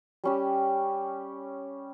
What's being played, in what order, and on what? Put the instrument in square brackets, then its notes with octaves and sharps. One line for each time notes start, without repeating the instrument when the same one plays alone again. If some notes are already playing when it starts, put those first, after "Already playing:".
[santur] G3 C#4 G4